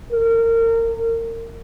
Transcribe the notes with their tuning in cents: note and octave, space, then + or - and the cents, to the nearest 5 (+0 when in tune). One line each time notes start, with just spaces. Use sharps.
A#4 -30